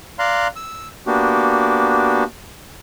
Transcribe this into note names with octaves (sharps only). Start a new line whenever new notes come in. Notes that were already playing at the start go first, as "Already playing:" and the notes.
D5 F5 A#5 C6 F#6
E6
A#3 B3 D4 F#4 G4